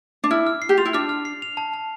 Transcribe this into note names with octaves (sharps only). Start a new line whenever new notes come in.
D4
E4 F6
F6
C7
G4
F4 F7
E4
D4 F6
F6
C7
F7
A5
A5